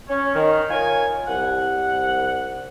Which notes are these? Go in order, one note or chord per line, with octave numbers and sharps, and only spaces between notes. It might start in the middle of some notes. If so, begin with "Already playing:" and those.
C#4
D#3
F4 A#4 C#5 G#5
C2 F#5